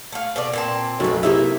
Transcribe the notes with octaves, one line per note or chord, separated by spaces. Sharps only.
A3 F5
B2 A3 D5
A#2 C4 A5
B1 F#2 A3 B4
C3 A#3 D#4 E4 E5